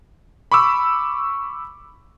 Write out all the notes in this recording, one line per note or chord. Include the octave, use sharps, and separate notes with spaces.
B5 C#6 D6 E6